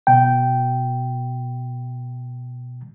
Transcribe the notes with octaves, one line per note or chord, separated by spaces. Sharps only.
B2 G5